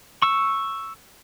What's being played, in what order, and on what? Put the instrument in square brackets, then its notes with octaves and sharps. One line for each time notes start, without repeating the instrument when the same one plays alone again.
[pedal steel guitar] C#6 E6